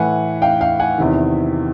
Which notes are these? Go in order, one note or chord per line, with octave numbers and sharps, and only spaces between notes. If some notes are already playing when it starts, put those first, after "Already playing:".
Already playing: A2 E3 F#5 G#5
F5 G5
F5 G5
F#5 G#5
E2 C3 D#3